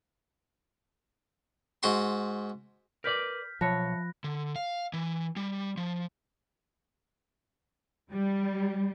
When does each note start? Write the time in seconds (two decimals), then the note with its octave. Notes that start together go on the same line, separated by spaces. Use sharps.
1.83 G#2 F#4 C6
3.04 A#4 B4 D5 F6 G6 B6
3.61 B1 F3 C#5 E5 A5 B5 F#6 A#6
4.24 D3
4.56 F5
4.93 E3
5.36 G3
5.77 F3
8.12 G3